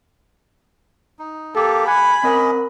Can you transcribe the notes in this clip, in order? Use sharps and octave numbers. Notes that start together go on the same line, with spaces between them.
D#4
A#3 G4 A4
F#5 G#5 B5
C4 C#4 A#4 D#5 F#5